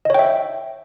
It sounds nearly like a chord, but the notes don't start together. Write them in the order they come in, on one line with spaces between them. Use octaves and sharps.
D#5 C#5 G5 E5